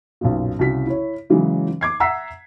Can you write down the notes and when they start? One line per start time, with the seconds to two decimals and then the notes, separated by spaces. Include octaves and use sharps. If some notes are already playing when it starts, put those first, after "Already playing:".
0.21 B1 F#2 A#2
0.59 C2 C#3 F#4 B6
0.87 E4 C#5
1.30 C#3 E3 F#3 G#3
1.81 D6 G#6 C7
2.00 E5 F#5 A#5 E6 B6 C7